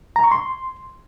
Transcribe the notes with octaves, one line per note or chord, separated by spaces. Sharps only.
A#5
C#6
C6